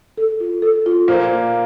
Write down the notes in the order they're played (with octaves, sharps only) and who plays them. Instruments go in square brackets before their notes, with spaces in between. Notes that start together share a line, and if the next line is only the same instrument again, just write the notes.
[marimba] A4
F4
A4
F4
[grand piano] A#2 A#3 [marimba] C5